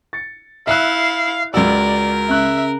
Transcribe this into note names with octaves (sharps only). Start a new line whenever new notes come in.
A6 C#7
E4 E5 F5 E6 F#6
C#2 F#4 A#4 D5 E6
C#3 E5 F#6